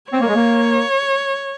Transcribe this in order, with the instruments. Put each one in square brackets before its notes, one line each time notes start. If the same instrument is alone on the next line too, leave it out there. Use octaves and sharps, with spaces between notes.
[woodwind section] C4 [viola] C#5
[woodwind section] A#3
G#3
A#3